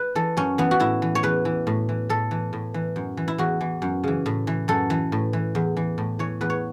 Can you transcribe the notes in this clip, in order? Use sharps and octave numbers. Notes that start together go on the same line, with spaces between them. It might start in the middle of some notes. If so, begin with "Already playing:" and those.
Already playing: B4
E3 A4
F#2 C#4
E3 B3
F#4
A2 E4
E3
C#5
E2 B4
E3
A2
E3
A2 A4
E3
A2
E3
F#2
E3
E4
E2 F#4
E3
F#2
C#3 E3
A2
E3
F#2 A4
E3
A2
E3
E2
E3
A2
E3 C#5
E2 B4
C#5